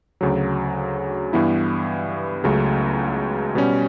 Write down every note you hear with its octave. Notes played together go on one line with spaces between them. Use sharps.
D2 C#3 F#3
G2 E3 B3 E4
C#2 C#3 F#3 A3
B2 G3 C#4